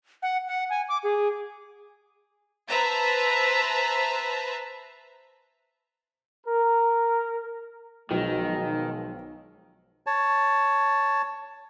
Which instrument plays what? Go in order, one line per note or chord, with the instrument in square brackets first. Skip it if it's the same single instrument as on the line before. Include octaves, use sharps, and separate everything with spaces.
[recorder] F#5
F#5
G#5
D6
G#4
[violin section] B4 C5 E5 A5 A#5
[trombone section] A#4
[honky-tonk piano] B1 [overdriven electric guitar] D#3 [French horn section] F3 G#3
[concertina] C#5 A5